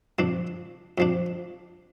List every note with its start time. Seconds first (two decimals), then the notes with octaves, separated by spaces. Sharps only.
0.19 F2 F3 D4
0.98 F2 F3 D4